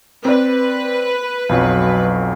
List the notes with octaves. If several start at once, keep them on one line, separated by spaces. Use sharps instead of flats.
C4 B4 D5
B1 F2 F#3